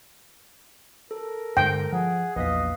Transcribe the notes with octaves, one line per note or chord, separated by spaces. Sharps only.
A4 A#4
G2 D3 G#3 G5
F3 G#4 F#5
A#1 E2 B4 D#5 F5 B6